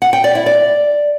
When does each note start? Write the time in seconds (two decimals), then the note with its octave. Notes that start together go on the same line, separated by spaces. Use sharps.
0.02 F#5
0.13 G5
0.24 D5
0.35 E4
0.46 D5